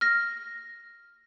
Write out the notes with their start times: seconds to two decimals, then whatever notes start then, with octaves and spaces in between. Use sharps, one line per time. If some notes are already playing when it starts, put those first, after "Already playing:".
0.01 F6 A#6